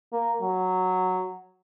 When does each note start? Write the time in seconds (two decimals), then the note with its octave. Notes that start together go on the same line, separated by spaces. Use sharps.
0.12 A#3
0.41 F#3